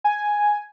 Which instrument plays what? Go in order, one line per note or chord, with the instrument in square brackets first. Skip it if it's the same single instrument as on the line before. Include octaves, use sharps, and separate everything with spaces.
[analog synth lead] G#5